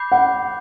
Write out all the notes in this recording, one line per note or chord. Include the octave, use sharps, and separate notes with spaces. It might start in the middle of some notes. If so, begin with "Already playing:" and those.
Already playing: B5 D6 G6 C7
F#5